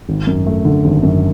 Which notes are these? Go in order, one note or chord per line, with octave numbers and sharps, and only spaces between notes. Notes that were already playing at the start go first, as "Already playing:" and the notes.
G#1
F#2
A3
D3
G#1
F#2